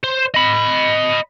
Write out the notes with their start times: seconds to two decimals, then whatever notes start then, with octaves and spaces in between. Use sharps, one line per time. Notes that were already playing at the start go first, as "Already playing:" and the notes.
0.04 C5
0.34 D#5 B5